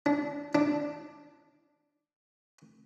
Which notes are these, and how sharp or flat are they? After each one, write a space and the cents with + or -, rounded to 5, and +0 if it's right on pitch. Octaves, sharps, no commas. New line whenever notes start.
D4 -25
D4 +0